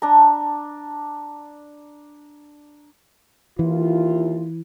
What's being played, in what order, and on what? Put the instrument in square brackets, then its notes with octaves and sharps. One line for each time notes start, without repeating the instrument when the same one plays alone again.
[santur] D4 A5 A#5
[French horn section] D#2 E4 F4 [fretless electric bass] E3